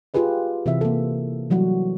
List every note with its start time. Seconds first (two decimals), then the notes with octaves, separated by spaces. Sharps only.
0.14 F4 G4 G#4 B4 D#5
0.66 C3 E3 C4 E5
0.81 A#3 A4
1.50 E3 F#3 G3 F#4